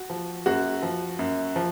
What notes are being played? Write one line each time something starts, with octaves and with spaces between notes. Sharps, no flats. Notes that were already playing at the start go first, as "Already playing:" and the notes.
Already playing: F#4
F3
F#2 F#4
F3
F#2
F3